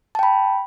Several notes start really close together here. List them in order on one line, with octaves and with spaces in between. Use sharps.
A5 G5 B5